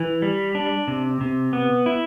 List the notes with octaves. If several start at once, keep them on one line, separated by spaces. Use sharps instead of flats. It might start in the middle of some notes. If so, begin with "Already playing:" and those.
Already playing: E3
G3
D4
C3
C3
B3
E4